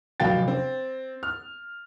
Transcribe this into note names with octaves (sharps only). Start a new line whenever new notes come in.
F1 F#3 F5 G5 A6
C4
F6